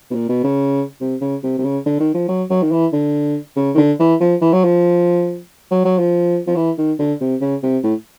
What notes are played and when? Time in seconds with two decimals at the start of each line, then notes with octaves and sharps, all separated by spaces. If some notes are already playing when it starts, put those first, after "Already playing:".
0.11 B2
0.14 A#2
0.29 B2
0.44 C#3
1.01 C3
1.21 C#3
1.43 C3
1.58 C3
1.64 C#3
1.86 D3
2.00 D#3
2.14 F3
2.28 F#3
2.50 F#3
2.62 D#3
2.71 E3
2.92 D3
3.56 C#3
3.74 D#3
3.77 D3
4.00 E3
4.20 F3
4.41 E3
4.53 F#3
4.64 F3
5.71 F#3
5.85 F#3
5.98 F3
6.47 F3
6.56 E3
6.78 D#3
6.99 D3
7.20 C3
7.41 C#3
7.63 C3
7.84 A2